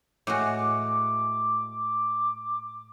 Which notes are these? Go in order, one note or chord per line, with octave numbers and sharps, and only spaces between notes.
A2 G#3 F#4 D6